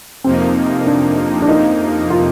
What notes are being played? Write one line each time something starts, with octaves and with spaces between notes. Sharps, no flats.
F2 C3 F3 A#3 C4 D#4
D4
D4
D#4
F4